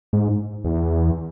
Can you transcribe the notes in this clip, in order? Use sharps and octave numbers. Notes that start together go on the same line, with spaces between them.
G#2
E2